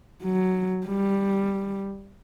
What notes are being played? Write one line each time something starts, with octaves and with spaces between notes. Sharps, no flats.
F#3
G3